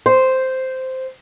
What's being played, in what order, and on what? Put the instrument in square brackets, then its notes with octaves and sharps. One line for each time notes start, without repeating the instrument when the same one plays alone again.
[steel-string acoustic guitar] C5